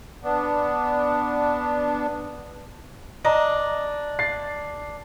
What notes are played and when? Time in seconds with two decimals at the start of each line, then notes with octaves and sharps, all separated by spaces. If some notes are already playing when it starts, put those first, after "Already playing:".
0.23 B3 D4
3.25 D4 D#5 A#5
4.19 A6 C7